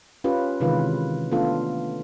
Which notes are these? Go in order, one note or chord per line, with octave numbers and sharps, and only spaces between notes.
C#4 F4 G4 B4
C3 D#3 E3 G#3 F4 B4
A3 B3 C#4 D4 F4 A4